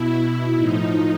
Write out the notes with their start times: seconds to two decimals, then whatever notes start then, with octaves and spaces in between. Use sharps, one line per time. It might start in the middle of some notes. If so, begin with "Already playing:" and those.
Already playing: B2 E4
0.21 E4
0.56 A2 F3 D#4